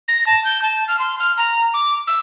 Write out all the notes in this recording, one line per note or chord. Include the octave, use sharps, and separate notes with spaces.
A#6
A5
G6
A5
F6
C6
F6
A#5
D6
E6